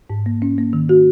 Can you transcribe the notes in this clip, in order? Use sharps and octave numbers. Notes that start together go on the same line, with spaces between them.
G#2
A#3
C#4
A#3
D#3
F#4